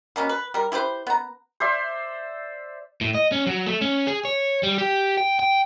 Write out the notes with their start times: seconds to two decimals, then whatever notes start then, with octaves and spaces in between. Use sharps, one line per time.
0.16 B2 A#3 B3 C#4
0.29 B4
0.54 G3 A#4
0.72 E4 G4 B4 C5
1.07 B3 A#5
1.60 C5 D5 E5 C6
3.01 A2
3.15 D#5
3.32 C#4
3.47 F#3
3.66 A3
3.81 C#4
4.07 G#4
4.25 C#5
4.63 G3
4.78 G4
5.18 G5
5.40 G5